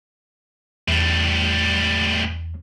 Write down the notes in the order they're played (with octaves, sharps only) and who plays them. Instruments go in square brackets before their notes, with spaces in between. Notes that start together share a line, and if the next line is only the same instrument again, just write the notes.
[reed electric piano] E2 [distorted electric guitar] A2 G3